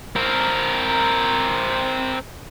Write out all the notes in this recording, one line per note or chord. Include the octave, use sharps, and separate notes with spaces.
C4 A#4